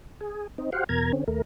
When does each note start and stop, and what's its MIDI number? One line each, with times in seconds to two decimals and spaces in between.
0.21 0.47 68
0.58 0.70 60
0.58 0.70 63
0.72 0.84 66
0.72 0.84 67
0.72 0.84 72
0.72 0.84 77
0.72 0.84 78
0.89 1.12 40
0.89 1.12 47
0.89 1.12 70
0.89 1.12 82
0.89 1.12 92
1.12 1.24 50
1.12 1.24 60
1.12 1.24 61
1.28 1.42 39
1.28 1.42 57
1.28 1.42 70